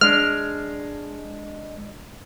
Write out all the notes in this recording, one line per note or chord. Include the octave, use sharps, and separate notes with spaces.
G#3 D4 F6